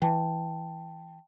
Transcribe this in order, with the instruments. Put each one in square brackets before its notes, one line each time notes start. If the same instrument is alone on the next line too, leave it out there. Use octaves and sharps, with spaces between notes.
[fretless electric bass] E3 [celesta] G5 A5